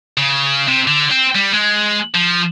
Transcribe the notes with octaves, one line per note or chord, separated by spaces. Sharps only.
C#3
C3
D3
C4
G3
G#3
F3